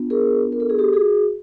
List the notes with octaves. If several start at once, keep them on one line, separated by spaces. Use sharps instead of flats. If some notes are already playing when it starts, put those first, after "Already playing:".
Already playing: B3 D4 F4
G#4 A#4
A#4
A4
G#4
G4 A4
F#4 G#4